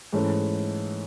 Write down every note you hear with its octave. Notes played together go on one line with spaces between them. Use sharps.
G#2 E3 A3 C#4